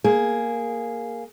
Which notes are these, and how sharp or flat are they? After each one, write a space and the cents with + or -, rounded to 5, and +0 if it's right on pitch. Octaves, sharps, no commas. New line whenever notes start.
A#3 +0 G#4 +0